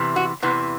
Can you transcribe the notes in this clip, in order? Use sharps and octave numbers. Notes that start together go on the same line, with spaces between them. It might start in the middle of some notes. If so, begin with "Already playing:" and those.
Already playing: E2 C3 E3
F#4
E2 C3 E3 B3